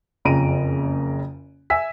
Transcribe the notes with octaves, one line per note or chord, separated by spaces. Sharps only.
F#1 F2 C#3 A#5 D7 D#7
E5 G#5 E6 B6